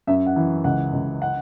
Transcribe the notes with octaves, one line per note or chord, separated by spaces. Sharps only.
F#2 E5
F#5
E3
C#2 F#5
C#2
F#5